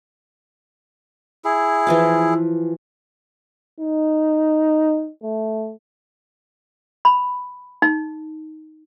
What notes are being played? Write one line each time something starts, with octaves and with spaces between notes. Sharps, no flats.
E4 G#4
E3 F3 F4
D#4
A3
B5
D#4